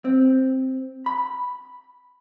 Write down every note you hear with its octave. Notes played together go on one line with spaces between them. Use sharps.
C4
B5